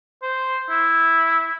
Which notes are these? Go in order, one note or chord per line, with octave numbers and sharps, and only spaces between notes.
C5
E4